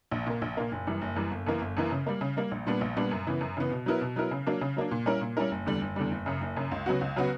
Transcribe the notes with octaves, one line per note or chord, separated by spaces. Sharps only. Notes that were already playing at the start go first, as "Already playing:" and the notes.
A#1
A#2 A#3
A#1
A#2 A#3
F#1
F#2 E3 G3
F#1
F#2 E3 G3
G1
F#2 E3 A#3
G1
F#2 E3 A#3
C#3
G3 A#3
C#3
G3 A#3
A#1
A#2 G3 B3 D4
A#1
A#2 G3 B3 D4
F#2
C#3 E3 B3
F#2
C#3 E3 B3
B2
F#3 B3 E4 A#4
B2
F#3 B3 E4 A#4
C#3
F#3 A#3 D4
C#3
F#3 A#3 D4
A#2
G3 C#4 E4 A#4
A#2
G3 C#4 E4 A#4
F#1
E2 D3 G3
F#1
E2 D3 G3
F#1
F#2 C#3
F#1
F#2 C#3
C#2
C#3 F#3 B3 F#4
C#2
C#3 F#3 B3 F#4